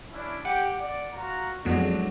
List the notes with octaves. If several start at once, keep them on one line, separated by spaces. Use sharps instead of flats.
C#4 D4 E4
G4 F#5 G5 D6
D5
F4 F#4 A#5
F2 A2 F#3 G#3 B3 D4